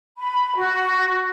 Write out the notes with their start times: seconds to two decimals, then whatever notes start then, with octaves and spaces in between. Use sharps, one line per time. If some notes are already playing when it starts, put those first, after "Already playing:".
0.17 B5
0.56 F#4